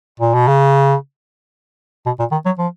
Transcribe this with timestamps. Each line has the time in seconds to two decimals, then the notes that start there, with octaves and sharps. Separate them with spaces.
0.20 A#2
0.34 B2
0.48 C#3
2.06 B2
2.19 A#2
2.32 D#3
2.46 F#3
2.59 F3